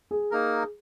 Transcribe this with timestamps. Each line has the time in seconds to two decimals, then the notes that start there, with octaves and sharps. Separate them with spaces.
0.11 G#4
0.31 A#3 D#4 A#4